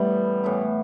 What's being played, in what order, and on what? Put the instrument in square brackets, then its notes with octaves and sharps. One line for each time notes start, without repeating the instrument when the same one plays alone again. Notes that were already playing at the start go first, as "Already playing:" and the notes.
Already playing: [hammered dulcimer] A2 E3 B3 E4 [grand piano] G3
[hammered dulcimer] A2 E3 B3 E4